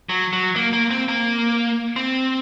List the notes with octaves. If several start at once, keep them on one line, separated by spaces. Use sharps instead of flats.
F#3
F#3
A#3
A#3
C4
A#3
C4